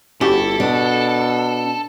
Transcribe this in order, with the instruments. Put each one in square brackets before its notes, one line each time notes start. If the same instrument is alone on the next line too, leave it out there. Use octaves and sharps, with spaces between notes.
[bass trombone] G1 [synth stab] C#4 F#4 G4 [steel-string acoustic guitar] E4 [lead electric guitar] A4
[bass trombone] B2 [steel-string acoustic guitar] D4